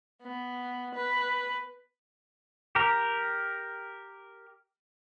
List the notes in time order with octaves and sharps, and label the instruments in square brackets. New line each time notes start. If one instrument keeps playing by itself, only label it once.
[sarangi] B3
B4
[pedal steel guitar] G4 A#4